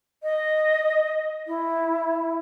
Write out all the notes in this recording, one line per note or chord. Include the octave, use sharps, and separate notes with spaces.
D#5
E4